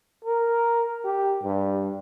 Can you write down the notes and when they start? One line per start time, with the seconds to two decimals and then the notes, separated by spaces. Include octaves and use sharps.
0.24 A#4
1.04 G4
1.43 G2